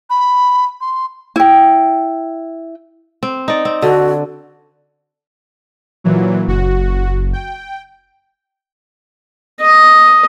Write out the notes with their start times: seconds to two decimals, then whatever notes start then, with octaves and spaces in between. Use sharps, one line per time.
0.10 B5
0.81 C6
1.36 E4 G5
3.23 C4
3.48 D#4 D5
3.65 C4
3.82 D3 F#4
6.04 A#2 E3 F#3
6.48 F#1 F#4
7.33 G5
9.61 D#5